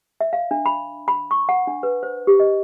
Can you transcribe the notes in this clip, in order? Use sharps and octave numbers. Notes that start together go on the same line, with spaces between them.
E5
F5
D4
B5
B5
C#6
F#5
D4
B4
C5
G4
D#5